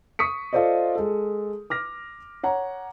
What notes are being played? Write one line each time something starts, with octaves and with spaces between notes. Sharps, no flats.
C#6 D#6 B6 C#7
F4 A4 C5 D5 D#5
G#3 A4
D6 F6 A#6
C#5 F#5 A#5